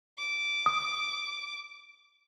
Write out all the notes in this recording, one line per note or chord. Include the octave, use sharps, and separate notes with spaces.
D6
D#6